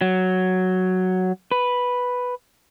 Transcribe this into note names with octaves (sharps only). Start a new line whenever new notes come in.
F#3
B4